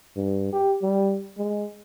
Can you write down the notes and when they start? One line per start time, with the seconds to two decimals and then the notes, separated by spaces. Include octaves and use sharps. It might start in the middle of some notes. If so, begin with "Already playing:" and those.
0.16 G2
0.53 G4
0.82 G3
1.38 G#3